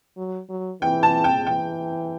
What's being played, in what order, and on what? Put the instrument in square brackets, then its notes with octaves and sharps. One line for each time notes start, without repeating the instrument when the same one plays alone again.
[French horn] F#3
F#3
[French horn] E3 [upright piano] G5
[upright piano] A5
G5
[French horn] E3 [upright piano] G5